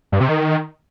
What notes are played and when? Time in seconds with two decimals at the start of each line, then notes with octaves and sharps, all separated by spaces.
0.12 G2
0.21 C3
0.29 D#3